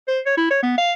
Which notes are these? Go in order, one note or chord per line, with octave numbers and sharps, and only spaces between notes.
C5
C#5
E4
C#5
B3
F5